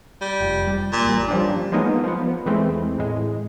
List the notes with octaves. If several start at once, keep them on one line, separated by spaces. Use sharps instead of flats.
G3
F1
G3
A#2
G#1 G3
F3 G3 C#4 D4
F3 F#3 G#3 A#3 B3 D#4
F3 B3
E2 E3 G#3 A3 C4
A2 G#3